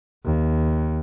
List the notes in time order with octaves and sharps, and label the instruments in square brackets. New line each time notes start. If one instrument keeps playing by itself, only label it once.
[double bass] D#2